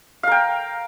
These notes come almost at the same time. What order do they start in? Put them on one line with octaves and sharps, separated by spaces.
F5 A#4 G5